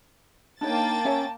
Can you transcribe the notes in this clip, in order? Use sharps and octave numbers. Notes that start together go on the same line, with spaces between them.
A#3 D4 D#4 C#5 G5 A5 A6
C#4 C#5 E5